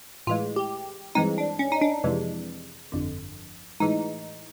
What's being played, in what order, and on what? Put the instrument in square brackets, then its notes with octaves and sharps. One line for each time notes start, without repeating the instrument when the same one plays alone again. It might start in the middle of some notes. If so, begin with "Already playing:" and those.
[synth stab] A2 E3 G#3 F4
G4
G2 E3 G#3 C4 D#4
D4
C#4
D#4
D4
F2 C3 E3 G#3
G1 F2 D3
A2 E3 G#3 D#4